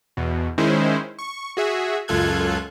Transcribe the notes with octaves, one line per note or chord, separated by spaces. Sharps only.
E2 B2
D#3 G#3 C#4 E4 C5
C#6
F#4 G#4 E5
C#2 F#2 F4 A4 F#6 G#6